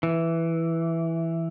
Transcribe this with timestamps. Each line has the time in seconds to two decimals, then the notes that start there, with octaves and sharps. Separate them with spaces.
0.03 E3